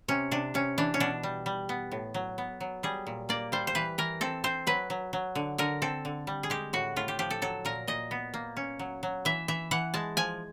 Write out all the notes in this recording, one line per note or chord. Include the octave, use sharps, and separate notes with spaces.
C3 C#4
C3 D4
C3 C#4
E3 D4
C#4
B2 D4
G3
G3
B3
A2
F#3
B3
F#3
G3 G#4
A#2
A#3 D5
G3 C5
C5
E3 B4
E3 A#4
C4 A4
C4 C5
F#3 B4
F#3
F#3
D3
D3 A#4
C4 A4
D3
G3
G#4
G#3 G4
A2 F#4
A2 F4
G4
F3 G4
A4
F#3 A4
A#2 A#4
A#2 D#5
B3
A#3
C#4
F#3
F#3
E3 E5
E3 E5
E3 F#5
G#3 A5
F3 G#5